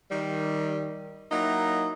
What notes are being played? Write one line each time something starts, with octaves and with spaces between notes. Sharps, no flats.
D#3 G3
F#3 A#3 D#4 E4